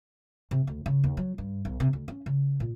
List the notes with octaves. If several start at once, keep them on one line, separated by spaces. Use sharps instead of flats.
C3
D2
C#3
D#2
F#3
G2
B1
C3
D2
C#4
C#3
A#2